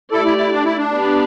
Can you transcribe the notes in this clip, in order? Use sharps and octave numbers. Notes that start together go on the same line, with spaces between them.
A3 E4 G4 A4 D5
E4
E4
D4
E4
D4
B3 G4 B4 D5